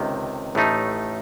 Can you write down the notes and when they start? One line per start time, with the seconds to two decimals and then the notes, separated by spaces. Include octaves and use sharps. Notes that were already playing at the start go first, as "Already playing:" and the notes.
Already playing: C#2 C3 D#3
0.55 A1 A2 A3 D#4